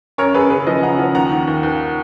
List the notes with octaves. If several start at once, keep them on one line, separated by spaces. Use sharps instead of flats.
F#2 A#4 C#5
F#2 G#4 B4
C#3 G#4 B4
F3 B4 D#5
C#3 F#5 A#5
F3
D#2 F#5 A#5
D#3
D#2
D#2